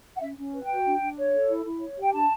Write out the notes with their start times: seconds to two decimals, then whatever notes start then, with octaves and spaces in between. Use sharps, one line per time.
0.16 F#5
0.21 C#4 E5
0.37 C#4
0.53 B4
0.64 G5
0.69 F#4
0.85 D4
1.01 D4
1.18 C#5
1.33 A4
1.49 E4
1.65 E4
1.81 C#5
1.97 G4 G5
2.13 D4 A5